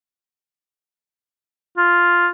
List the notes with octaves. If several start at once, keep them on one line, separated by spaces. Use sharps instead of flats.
F4